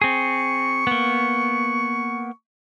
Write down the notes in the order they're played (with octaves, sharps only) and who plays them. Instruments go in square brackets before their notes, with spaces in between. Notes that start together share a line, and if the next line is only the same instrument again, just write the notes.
[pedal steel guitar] C4 G#4 [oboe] C#6
[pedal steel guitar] A#3 B3